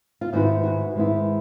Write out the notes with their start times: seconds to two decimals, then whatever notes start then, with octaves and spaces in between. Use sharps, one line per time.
0.21 F4
0.33 G#2 D#3 G#3 B3 E4 F#4
0.63 F#4
0.95 G#2 D#3 G#3 B3 E4